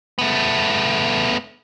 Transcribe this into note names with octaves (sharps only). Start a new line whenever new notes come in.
A3 B3